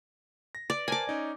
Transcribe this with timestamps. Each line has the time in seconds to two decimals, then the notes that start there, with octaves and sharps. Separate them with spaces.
0.55 A#6
0.70 D5
0.88 A#4 C5 G#5 A5 D6
1.07 C#4 D#4 D5